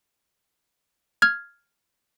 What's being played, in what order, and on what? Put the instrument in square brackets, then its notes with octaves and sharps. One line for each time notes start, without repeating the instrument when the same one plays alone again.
[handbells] F6 G#6